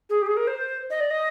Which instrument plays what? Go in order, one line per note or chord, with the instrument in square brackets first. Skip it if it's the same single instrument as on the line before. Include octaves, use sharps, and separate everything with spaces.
[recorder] G#4
G4
G#4
A#4
C5
D#5
D5
D#5